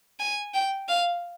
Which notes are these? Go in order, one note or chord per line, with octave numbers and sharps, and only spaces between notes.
G#5
G5
F5